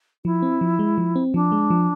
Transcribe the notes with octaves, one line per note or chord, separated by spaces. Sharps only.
F3 E4
C4
F3
G#3
F3
C4
F3 D4
G#3
F3